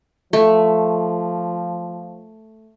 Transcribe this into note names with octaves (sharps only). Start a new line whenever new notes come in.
F3 A3